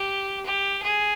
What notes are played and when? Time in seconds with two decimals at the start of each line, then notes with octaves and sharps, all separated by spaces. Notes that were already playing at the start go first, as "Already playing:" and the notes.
Already playing: G4
0.46 G4
0.83 G#4